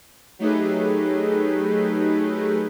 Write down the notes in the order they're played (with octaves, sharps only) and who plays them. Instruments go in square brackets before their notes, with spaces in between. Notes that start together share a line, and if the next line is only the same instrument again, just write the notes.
[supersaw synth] F#3 A3 D#4 G4 G#4 B4